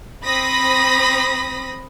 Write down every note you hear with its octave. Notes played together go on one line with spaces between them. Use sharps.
C4 B5 D#6 A#6 B6